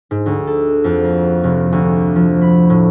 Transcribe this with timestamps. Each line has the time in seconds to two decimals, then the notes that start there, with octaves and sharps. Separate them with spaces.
0.11 G#2
0.26 D2
0.47 A4
0.84 F2
1.04 A#3
1.44 F1
1.72 D2
2.16 F3
2.41 B5
2.70 A2